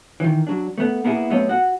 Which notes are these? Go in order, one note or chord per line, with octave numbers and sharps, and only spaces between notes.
D#3 E3
F#3 D4
A3 B3
A#3 B3 E4 F#4 G#4
F#3 A3 B3 C4 C#5 D#5
F#4 F#5